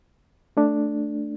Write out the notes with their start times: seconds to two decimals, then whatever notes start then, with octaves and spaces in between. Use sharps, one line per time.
0.57 A3 D4